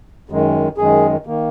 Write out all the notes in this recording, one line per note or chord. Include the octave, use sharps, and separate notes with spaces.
F#2 D#3 G#3
F#2 D#3 G#3 G#4
D#3 A#3